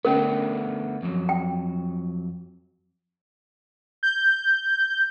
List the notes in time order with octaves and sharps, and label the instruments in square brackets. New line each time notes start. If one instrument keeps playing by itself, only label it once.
[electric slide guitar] D3 A3 B3 [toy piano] C#4 A#4
[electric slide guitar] F2 F#3
[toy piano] G5
[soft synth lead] G6